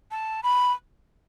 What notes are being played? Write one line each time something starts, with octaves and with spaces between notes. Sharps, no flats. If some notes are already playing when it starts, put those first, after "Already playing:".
A5
B5